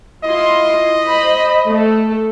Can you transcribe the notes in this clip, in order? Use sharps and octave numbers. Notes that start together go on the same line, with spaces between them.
E4 F4 D#5 C6
C5 B5
A3 A4